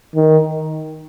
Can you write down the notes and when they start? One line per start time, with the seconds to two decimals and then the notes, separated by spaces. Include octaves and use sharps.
0.15 D#3